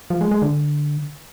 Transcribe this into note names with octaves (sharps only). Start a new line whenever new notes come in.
F3
G#3
G#3
D3